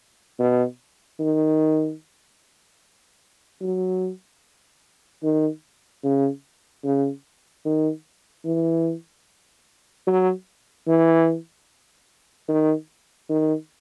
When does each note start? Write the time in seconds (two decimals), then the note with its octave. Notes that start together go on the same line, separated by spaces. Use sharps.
0.39 B2
1.19 D#3
3.61 F#3
5.23 D#3
6.04 C#3
6.84 C#3
7.65 D#3
8.45 E3
10.07 F#3
10.87 E3
12.48 D#3
13.29 D#3